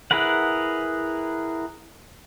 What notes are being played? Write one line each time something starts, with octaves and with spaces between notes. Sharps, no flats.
E4 G#4 A#4 B4 F#5